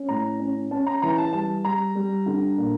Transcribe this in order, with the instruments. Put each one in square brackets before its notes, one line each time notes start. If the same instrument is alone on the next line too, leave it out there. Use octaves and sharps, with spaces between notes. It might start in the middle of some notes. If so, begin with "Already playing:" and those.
Already playing: [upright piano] C#4
A2 A#5
C#4
C#4 A5
A#5
E3 A#5
A5
G3 A5
G3 A#5
G3
D3
A#2